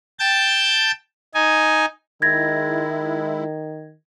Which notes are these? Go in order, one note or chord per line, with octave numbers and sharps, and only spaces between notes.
G5 A5 G6 A6
D#4 G#5
D#3 G#3 E4 G#6 A#6